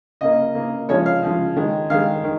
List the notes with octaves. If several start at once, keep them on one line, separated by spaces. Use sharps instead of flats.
C#3 A#3 D#5
C#3 A#3
C#3 F3 G#3 C#5
F5
C#3 F3 G#3
D#3 G#3
D#3 G#3 F5
D#3